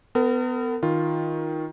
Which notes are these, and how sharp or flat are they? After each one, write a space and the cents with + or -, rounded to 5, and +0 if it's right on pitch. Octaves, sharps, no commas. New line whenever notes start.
B3 +25 A#4 -40
D#3 +10 F4 +0